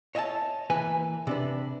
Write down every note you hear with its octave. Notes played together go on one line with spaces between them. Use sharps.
C#5 D#5 E5 G#5 A5
E3 A#3 B4 G#5
C3 D4 B4